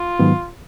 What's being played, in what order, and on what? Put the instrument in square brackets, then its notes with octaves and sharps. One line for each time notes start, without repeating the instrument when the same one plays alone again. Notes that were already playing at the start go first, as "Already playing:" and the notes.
Already playing: [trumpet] F4
[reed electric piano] G#2 D#3 F#3 B3